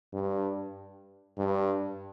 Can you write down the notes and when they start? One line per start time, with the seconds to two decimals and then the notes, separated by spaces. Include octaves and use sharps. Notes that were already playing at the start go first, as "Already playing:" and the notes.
0.13 G2
1.37 G2